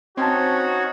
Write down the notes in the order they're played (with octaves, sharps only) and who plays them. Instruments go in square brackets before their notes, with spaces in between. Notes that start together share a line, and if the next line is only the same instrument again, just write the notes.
[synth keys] C4 [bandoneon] C#4 D#4 C#5 [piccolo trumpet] F#4 [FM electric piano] C5 A5